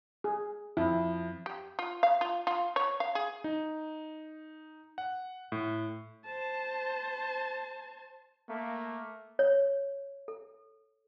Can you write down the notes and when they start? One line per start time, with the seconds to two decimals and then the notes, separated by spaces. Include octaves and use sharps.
0.24 G#4
0.77 F2 E4
1.46 G4
1.79 F4
2.03 F5
2.21 F4
2.47 F4
2.76 C#5
3.00 F5
3.15 G#4
3.44 D#4
4.98 F#5
5.52 A2
6.25 C5 A5
8.49 A3 A#3
9.39 C#5
10.28 A4